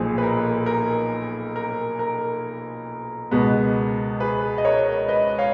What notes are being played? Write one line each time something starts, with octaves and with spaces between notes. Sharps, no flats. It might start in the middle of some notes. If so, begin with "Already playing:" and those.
Already playing: B1 A#2 F3 G#4
B4
A#4
A#4
A#4
A#4
C#2 B2 G#3 B3
G#4 B4
D#5
A#4 C#5
B4 D#5
C#5 F5